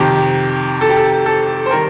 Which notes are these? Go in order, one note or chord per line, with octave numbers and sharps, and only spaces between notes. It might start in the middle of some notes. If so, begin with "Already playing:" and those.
Already playing: F2 C3 D#3 G4
A4
G4
A4
A4
C5
D#3 G3 A#4